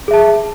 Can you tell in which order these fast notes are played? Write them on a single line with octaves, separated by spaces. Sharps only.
G#4 E5 A5